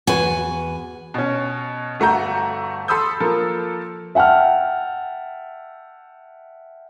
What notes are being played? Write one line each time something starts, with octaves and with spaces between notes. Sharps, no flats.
E2 F#4 B4 G#5
B2 C#4
G1 A3 F#4 A#5 G6
A4 B5 C6 D#6 E6 G6
F3 A#3 A4 A#4
E5 F#5 G5 A5 F6